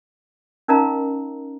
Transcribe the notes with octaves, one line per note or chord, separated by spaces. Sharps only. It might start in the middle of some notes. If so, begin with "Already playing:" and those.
C#4 D#4 A#4 D#5 F5 A#5